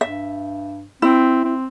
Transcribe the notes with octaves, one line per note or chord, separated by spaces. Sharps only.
G2 E5
C4 E4
C4